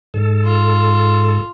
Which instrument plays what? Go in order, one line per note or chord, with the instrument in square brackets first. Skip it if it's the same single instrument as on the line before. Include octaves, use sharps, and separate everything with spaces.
[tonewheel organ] G#2 A4
[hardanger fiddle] F4